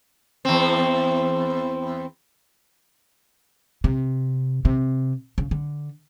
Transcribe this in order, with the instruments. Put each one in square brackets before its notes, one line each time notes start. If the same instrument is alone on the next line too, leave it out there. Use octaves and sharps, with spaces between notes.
[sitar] E2 C4
[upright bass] C3
C3
C#3
D3